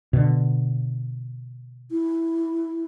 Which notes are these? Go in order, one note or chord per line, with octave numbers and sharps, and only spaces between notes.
B2 D3
E4